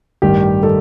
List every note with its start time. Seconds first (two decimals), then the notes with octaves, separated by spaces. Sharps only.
0.22 A1 G2 D#3 G3 G4
0.63 D#3 G3 A4